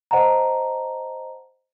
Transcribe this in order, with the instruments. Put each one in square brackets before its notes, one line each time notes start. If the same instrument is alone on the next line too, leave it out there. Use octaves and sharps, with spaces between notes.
[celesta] C5 D#5 F#5 A5 A#5